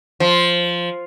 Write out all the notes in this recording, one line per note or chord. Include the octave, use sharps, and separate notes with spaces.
F3